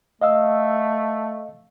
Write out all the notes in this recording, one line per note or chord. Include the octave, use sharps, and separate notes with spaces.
A3 D#5 F5 E6